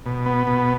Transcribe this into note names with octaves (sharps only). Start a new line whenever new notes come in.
B2
B3
B2